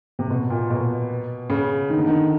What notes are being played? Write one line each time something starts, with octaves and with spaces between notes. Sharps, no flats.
C3
B2
A#2
B2
C#3
D#3
D3
D#3